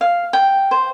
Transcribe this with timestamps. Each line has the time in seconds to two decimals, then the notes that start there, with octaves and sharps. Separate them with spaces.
0.01 F5
0.33 G5
0.71 C5